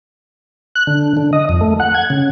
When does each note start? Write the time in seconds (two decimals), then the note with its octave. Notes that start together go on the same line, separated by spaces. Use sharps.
0.75 F#6
0.87 D3
1.17 D3
1.33 D#5
1.49 F2
1.61 A3
1.80 F#5
1.94 G#6
2.10 C#3